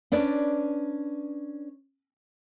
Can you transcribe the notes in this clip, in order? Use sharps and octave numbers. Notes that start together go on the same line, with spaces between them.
C#4 D4 B4 D5